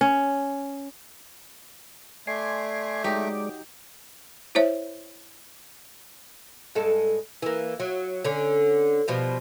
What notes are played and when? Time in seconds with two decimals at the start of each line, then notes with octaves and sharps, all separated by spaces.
0.01 C#4
2.27 A3 D5 G#5 C6
3.04 F#3 G#3 D#4 G4 D5
4.55 E4 C5 C#5 E5
6.75 G2 G#3 A4
7.42 E3 A#3
7.80 F#3
8.24 D3 C#4
9.08 B2 F3 G3